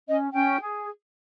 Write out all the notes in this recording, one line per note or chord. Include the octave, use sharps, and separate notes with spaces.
C#4 D#5
C#4 G5
G#4